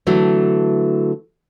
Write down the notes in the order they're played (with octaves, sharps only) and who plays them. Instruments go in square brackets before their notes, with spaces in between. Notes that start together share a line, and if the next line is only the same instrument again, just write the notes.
[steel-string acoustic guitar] D3 E3 F#3 A3